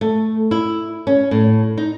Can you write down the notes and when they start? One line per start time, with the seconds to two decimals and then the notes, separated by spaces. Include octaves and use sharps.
0.01 A3
0.51 E4
1.07 C#4
1.31 A2
1.77 D#4